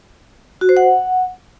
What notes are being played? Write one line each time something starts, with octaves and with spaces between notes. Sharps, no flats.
F#4
C5
F#5